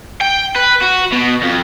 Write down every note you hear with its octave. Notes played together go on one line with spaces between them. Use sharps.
G5
B4
F#4
B2
F2